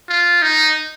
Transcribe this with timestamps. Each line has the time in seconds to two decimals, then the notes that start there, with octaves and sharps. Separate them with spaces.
0.09 F4
0.42 D#4